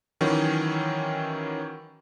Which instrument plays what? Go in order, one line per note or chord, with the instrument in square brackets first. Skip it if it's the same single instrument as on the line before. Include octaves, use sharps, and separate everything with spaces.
[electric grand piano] D#3 E3 F#3 C#4